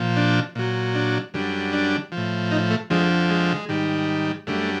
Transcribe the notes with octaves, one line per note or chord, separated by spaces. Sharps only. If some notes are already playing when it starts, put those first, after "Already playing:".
Already playing: A#2 F3
D4
A#2 F#3
D4
F#2 D3 G3
D4
F3
A2
D#4
A3
F2 D3 F3 G#3
G#3
G#2 D#3 G3
F#2 D3 G3 A3